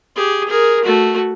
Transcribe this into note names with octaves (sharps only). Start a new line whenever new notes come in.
G4 G#4
G#4 A#4
A3 F#4